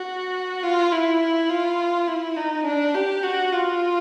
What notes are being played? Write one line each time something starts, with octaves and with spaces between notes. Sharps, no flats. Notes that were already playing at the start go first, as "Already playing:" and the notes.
Already playing: F#4
F4
E4
F4
E4
D#4
D4
G4
F#4
F4